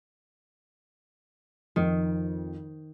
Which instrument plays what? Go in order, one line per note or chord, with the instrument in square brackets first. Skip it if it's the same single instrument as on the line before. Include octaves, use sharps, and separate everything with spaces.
[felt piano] F2 [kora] D#3